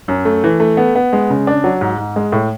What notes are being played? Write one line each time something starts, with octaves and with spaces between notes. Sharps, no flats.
F#2
A3
E3
A3
B3
B3
G#3
C#3
D4
F#3
G#2
G#2
G#3
A2